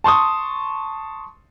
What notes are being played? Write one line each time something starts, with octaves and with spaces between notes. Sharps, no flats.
A5 C6 C#6 D#6